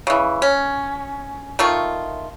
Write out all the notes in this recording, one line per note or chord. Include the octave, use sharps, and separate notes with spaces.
C#3 E3
C#4
D#3 A3 F4 C#6